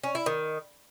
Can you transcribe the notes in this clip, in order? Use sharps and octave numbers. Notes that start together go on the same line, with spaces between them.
C#4
E4
D#3